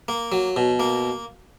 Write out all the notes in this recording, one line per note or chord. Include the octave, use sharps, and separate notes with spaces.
A#3
F#3
B2
A#3